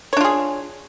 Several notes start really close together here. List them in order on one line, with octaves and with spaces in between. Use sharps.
C#5 D4 F4 G#4